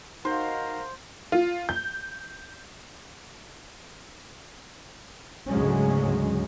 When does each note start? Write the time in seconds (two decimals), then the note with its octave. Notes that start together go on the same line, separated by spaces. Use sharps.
0.25 D#4 F#4 A#4 C5 F5
1.32 F4
1.69 G6
5.49 D2 G#2 C#3 F#3 G#3 C#4